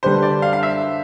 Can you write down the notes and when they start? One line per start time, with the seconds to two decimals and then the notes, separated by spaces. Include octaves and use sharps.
0.03 D3 G3 D4 G4 B4 C5
0.22 D5
0.42 F5
0.53 F5
0.63 E5